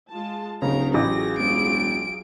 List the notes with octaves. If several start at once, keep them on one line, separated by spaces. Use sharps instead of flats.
G#3 F4 A5
D1 C#3 D#4 A#4 A#5
A1 F#3 F4 G#4 A#6
E1 D7